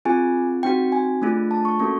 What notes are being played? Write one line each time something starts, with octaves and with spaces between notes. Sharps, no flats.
C4 F4 G#4 G#5
C4 D#4 F#4 G5
G#5
A3 D4 F4 G#4
A5
C#6
A#3 C#4 F#4 A4 C#6